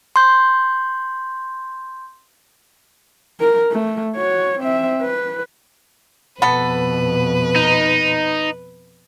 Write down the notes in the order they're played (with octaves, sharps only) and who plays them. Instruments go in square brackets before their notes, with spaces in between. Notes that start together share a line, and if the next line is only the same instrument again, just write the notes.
[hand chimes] C6 G6
[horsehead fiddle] A#4
A3
F#4 C#5
C4 E5
B4
[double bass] F2 B2 [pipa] B3 A4 [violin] B4
[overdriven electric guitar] D#4